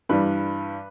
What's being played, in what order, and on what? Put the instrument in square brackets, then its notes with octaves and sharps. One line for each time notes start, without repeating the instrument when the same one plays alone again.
[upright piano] G2 E3 G3 B4